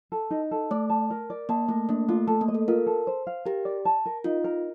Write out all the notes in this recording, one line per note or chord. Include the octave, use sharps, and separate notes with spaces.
A4
D#4
A4
A3 D5
A5
A#4
D5
A#3 A5
A3 A#4
A#3 D4
A3 F4
A3 A4
A#3
D#5
A4
F4 A#4
A4
C5
F5
G4 A#4
D5
A5
A#4
D#4 F4
A#4